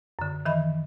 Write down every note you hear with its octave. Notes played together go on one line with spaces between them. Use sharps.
F#2 D3
D#3 E3 D#5 E5 B5